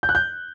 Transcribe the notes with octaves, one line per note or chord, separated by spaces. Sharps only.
G6
F#6
G6